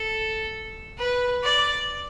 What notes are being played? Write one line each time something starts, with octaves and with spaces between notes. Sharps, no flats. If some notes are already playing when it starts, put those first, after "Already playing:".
Already playing: A4
B4
D5